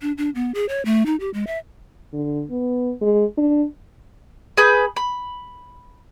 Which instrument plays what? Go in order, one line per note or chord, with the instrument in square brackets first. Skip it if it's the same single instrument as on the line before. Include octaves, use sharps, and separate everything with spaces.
[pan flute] D4
D4
B3
G#4
C#5
A3
D#4
G4
G#3
E5
[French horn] D3
B3
G#3
D4
[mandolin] G#4 B4 B5 G6
B5